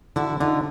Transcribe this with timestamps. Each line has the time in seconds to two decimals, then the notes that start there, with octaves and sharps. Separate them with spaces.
0.16 D3 E4 F#4
0.40 D3 D#4 F4